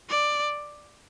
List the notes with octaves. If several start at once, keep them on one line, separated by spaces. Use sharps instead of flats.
D5